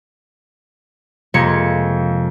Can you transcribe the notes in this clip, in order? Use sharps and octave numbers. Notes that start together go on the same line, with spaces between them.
F2 C3 G#3 A#3 G#6 C#7